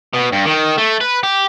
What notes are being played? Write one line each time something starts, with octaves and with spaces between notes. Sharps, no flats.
B2
G2
D#3
A3
B4
G4